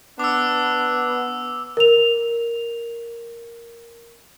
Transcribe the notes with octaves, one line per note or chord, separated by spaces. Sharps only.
B3 D4 D6 E6
A#4 F7